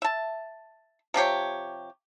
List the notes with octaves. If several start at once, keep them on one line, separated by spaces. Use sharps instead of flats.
E5 A5
C3 F3 G4 C#5